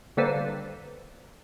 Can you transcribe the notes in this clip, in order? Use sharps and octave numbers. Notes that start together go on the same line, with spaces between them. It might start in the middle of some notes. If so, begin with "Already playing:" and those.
D3 G3 A#3 A4 B4 C5